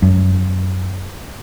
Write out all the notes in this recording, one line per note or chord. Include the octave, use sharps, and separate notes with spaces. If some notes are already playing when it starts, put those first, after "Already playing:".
F#2